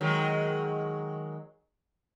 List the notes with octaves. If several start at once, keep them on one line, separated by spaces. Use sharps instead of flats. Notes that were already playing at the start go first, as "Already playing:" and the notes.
D#3 F#3 G#3